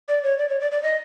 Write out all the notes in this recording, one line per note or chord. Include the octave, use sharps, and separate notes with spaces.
D5
C#5
D5
C#5
D5
D5
D#5